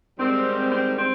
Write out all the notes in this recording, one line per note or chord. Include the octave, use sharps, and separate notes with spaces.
G#2 D#3 G3 C4
C4
C4